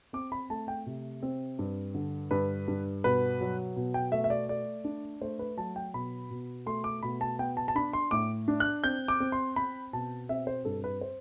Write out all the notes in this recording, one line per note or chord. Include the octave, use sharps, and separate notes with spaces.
C4 D6
B5
A3 A5
G5
C3
C4
G2
D3
G2 B4
G2
B2 B4
F#3
B2
G5
A3 E5
E5
D5
A3 D5
D4
A3 C5
B4
F#3 A5
G5
B2 B5
B2
A3 C6
D6
B2 B5
A5
B3 G5
A5
A5
D4 B5
C6
A2 D6
D4
F#6
C4 G6
D6
C4
C6
C4 B5
B2 A5
C4 E5
C5
G2 A4
B4
C5